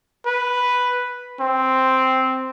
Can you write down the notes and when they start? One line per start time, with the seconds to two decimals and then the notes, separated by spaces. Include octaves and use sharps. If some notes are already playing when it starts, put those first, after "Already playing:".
0.26 B4
1.40 C4